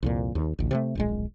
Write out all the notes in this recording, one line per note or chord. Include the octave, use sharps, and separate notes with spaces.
C2 F2 A#2
D#2
A1 D2
C3 E3 A3
D1 A#1 G#3